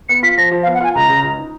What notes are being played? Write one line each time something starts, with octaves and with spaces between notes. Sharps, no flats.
B3 C#7
F4 B6
F3 A#6
F3
F5
B3
F#5
F4 G#5
C#2 A#5
C#3
C#2
D#4